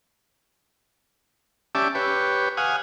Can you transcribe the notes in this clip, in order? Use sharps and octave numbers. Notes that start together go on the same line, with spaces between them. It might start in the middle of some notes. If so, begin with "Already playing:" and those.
C#4 G4 D5 E5 A5
G4 B4 C#5
F5 F#5 G#5 D#6